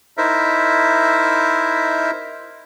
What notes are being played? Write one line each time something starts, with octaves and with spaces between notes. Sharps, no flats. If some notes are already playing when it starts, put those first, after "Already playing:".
D#4 E4 A#4 C5 E5